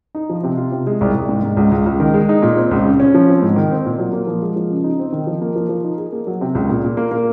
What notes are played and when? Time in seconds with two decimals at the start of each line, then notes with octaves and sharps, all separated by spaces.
0.15 D#4
0.29 F3
0.44 C3
0.57 F4
0.72 C3
0.87 G#3
1.01 C2
1.14 C2
1.29 G#2
1.43 G#2
1.57 C#2
1.71 C#2
1.86 C#2
2.00 D#3
2.14 G#3
2.29 D#4
2.42 A#2
2.57 C4
2.71 C#2
2.85 C#3
3.00 C#4
3.14 F3
3.28 C4
3.42 G#2
3.56 D#3
3.71 C4
3.85 A#2
3.99 F#3
4.13 A#3
4.27 F3
4.42 G#3
4.56 F3
4.70 C#3
4.84 D#4
4.99 C4
5.13 D#3
5.27 F3
5.41 A#3
5.56 F3
5.69 F3
5.84 D#4
5.98 G#4
6.12 A#3
6.27 F#3
6.41 C3
6.55 C#2
6.69 A#2
6.84 A#2
6.97 A#3
7.11 A#3